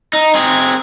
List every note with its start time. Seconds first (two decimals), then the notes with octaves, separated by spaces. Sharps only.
0.13 D#4
0.35 C4 G#4